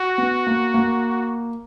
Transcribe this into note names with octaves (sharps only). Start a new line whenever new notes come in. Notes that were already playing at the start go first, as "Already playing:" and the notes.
Already playing: F#4
B3
A#3
A#3